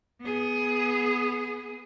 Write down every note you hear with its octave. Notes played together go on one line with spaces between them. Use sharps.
B3 G#4